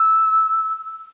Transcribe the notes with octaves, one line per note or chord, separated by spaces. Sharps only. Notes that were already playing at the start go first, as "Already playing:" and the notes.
Already playing: E6